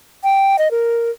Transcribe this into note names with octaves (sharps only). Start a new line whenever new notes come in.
G5
D#5
A#4